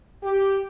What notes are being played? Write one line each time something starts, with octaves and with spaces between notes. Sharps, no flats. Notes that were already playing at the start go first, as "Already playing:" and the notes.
G4